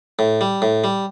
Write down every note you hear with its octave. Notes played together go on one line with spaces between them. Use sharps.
A2
G3
A2
G3